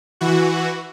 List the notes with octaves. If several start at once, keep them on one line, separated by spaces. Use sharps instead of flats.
E3 F#4